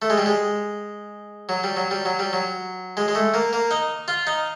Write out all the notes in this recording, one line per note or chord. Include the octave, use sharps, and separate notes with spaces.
A3
G#3
G3
G#3
F#3
G3
F#3
G3
F#3
G3
F#3
G#3
G#3
A3
A#3
A#3
D#4
F4
D#4